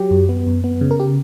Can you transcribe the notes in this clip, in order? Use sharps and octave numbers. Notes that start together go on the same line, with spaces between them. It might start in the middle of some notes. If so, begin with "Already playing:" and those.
Already playing: F#3 G4
F#2
B3
F#2
B3
C#3
A#4
G4